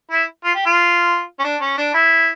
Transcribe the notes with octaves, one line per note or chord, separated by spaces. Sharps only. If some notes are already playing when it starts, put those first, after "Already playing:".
E4
F4
G4
F4
C#4
D4
C#4
D4
E4